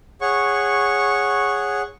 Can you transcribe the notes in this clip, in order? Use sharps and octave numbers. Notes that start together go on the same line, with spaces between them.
G#4 C#5 F#5 C#6